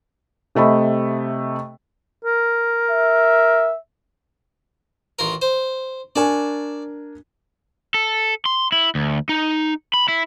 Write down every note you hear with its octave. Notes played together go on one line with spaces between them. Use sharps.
C3 A3 D#5 B5
A#4
E5
A1 F4 A#4
C5
D4 A#4 D5 G#5 A5 C#6
A4
C6
E4
D2
D#4
B5
E4